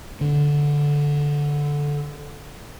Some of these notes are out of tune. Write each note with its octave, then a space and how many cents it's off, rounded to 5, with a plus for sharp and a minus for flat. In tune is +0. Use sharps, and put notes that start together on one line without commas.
D3 -10